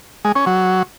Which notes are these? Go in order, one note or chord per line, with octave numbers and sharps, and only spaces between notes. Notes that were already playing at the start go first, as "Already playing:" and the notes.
G#3
C#4
F#3